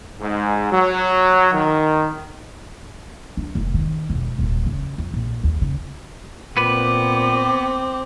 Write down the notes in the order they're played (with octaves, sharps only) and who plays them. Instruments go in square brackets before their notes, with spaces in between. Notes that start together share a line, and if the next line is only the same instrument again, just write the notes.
[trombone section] G#2
F#3
D#3
[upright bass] D4
F1
D#3
E1
D#1
C#3
F2
A#1
D#2
C#3
[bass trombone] A#2 [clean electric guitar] B3 B4 [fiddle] C4 [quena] D6